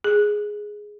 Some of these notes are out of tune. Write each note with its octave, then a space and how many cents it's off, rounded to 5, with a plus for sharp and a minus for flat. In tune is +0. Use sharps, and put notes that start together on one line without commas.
G#4 +0